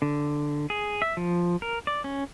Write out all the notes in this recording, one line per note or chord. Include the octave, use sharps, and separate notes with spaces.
D3
G#4
E5
F3
A#4
D5
C#4